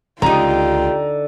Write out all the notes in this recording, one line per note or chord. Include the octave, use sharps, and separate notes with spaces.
C#2 D3 D#4 F4 G4 A#5